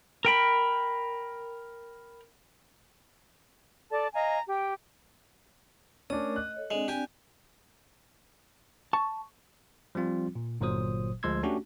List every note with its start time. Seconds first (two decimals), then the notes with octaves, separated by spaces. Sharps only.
0.25 A#4 G5 B5
3.91 A4 D5 A5
4.13 D#5 F5 G#5 A#5
4.48 G4 G5
6.10 A3 C#4 D4 A#4 D#6
6.36 D#5 F#6
6.55 A4 C#5 D#5
6.71 G#3 C4 D4 D5
6.88 G4 G#5
8.93 A5 C#6
9.95 F3 G3 C4 F4
10.35 A#2
10.61 G1 A#2 F#3 C5 D#6
11.23 D2 F3 G#3 C6 E6 G#6
11.43 A3 C#4 D4 F#4 G4